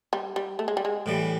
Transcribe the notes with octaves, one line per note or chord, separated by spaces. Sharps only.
G3
G3
A3
G#3
G3
G#3
A2 E3 G3